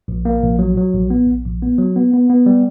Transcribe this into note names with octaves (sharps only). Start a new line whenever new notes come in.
A#1
A#3
A#1
F#3
F#3
A#1
B3
A#1
A#1
B3
F#3
B3
B3
B3
G3